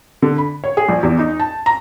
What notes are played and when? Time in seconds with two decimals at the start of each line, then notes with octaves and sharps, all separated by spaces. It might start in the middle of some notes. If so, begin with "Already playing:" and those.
0.22 D3
0.38 B5
0.64 C#5
0.77 G#4
0.89 A#1
1.03 E2
1.19 D#4
1.40 A5
1.66 A#5